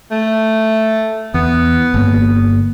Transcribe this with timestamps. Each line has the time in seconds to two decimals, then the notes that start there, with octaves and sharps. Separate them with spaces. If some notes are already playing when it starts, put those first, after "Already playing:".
0.11 A3
1.34 E2 B3
1.94 G1 A#3